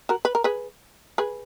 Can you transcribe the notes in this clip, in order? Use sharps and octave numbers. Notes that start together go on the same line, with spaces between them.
F#4 A#4
B4
A#4
G#4 B4
G#4 B4